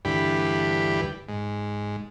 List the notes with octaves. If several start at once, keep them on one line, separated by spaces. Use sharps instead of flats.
D2 G2 E3 G4 B4
G#2